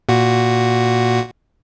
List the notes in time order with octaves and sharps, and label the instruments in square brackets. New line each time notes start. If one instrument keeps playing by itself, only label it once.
[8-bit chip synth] A#2 F#4